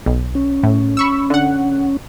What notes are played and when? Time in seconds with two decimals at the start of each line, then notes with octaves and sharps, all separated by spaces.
0.06 B1
0.35 C#4
0.63 A2
0.97 B5 C#6 E6
1.30 D3 F#5